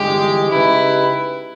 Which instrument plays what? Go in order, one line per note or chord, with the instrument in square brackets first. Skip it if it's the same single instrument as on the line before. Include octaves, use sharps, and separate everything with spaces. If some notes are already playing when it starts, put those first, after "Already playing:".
Already playing: [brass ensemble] G1 G2 E3 G#3 [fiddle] G4
[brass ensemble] C#3 G#3 D#4 G4 B4 [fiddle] E4